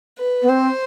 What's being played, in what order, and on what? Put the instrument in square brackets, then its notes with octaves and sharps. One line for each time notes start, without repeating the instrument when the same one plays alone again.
[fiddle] B4
[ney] B3
[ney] C4 [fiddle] C5